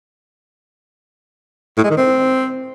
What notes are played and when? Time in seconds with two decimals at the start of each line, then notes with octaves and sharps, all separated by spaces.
1.77 A2
1.84 G#3
1.91 D#3
1.97 C4